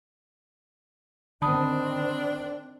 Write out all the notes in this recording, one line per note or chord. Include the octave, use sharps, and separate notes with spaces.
D3 D#3 C4 D4 A5 B5 D#6